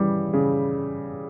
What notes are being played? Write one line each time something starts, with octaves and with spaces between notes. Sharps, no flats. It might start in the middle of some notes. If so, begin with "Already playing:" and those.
Already playing: C#3 E3 G3
C#3